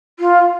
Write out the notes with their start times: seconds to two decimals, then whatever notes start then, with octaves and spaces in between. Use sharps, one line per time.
0.19 F4